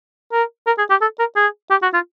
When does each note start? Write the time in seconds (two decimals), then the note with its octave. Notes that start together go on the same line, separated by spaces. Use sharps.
0.32 A#4
0.67 A#4
0.78 G#4
0.90 G4
1.01 A4
1.19 A#4
1.36 G#4
1.70 G4
1.83 F#4
1.94 F4